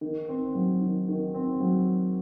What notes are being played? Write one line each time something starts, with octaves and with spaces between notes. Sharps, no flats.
D#3
C4
F#3
D#3
D#3
C4
F#3